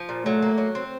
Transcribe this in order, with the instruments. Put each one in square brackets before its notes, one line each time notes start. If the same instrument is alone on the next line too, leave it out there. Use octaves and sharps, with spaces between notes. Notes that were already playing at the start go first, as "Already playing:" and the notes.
Already playing: [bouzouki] F3
A#2
[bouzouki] F#3 [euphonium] A3
[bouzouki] A#3
F#3
C4